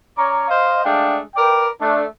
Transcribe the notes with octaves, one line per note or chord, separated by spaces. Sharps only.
C#4 C#5 D5 A#5
C5 D#5 F5
G#3 A3 D4 D5 F5 G5
A#4 B4 D5 G5
A3 D4